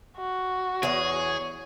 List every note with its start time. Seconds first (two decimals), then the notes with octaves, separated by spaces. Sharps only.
0.17 F#4
0.83 E2 G#4 C#5